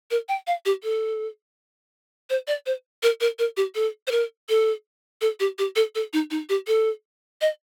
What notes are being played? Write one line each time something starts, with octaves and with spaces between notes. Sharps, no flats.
A#4
G5
F5
G4
A4
C5
D5
C5
A#4
A#4
A#4
G4
A4
C5
A#4
A4
A4
G4
G4
A4
A4
D#4
D#4
G4
A4
D#5